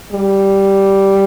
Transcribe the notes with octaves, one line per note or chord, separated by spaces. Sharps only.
G3